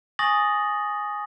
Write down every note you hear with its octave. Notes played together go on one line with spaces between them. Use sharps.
G#5 C#6 D#6 A6 A#6 F#7